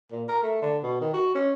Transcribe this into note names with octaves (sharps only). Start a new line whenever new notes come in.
A#2
A#4
A3
D3
B2
D#3
F#4
C#4